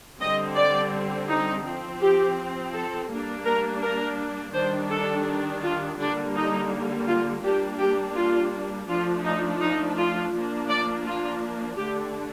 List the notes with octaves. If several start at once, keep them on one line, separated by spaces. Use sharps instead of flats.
D3 G3 C4 D#5
D5
D#4
F3 C4
G4
A4
G3 A#3 D4
A#4
A#4
D#3 G3 D4 C5
A4
F4
D3 G3 A#3 D4
D#4
F4
G3 A#3 D4 G4
G4
F4
F3 A3 D4 F4
D#4
D#4
F4
F3 A#3 D4
D5
F4
D3 A3 D4 G4